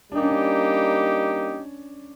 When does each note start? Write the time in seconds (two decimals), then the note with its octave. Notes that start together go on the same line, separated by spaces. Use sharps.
0.12 G3 A#3 D4 D#4 G4
0.20 C#4
0.29 D4